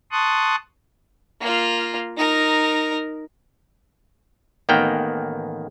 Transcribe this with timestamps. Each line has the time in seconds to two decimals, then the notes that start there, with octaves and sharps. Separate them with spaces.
0.12 A5 C6 C#6 D#6 F#6
1.41 A#3 F4
2.17 D#4 A#4
4.69 A1 D#3 A#3 B3 G5